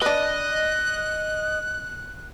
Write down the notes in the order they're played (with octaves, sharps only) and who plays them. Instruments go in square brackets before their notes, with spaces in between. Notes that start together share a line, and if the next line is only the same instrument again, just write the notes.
[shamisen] D4 B4 [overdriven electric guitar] D#5 [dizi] F#6